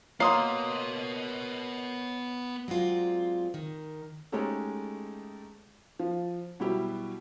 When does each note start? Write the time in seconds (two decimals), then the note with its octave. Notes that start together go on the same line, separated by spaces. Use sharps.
0.20 A#3 B3 C#5 D#5 C6 D#6 C7
2.68 F#3 G#3 C4 F4 D5
3.54 D#3
4.32 G#3 A3 C#4 D#4 G4 A4
6.00 F3
6.60 B2 F#3 G3 E4 G4